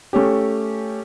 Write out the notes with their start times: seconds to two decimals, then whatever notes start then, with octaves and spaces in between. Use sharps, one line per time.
0.13 A3 C#4 G4